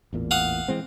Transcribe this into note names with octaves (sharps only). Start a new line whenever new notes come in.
A1 E2 A#2
F5 F#5 D#6
E3 G#3 C4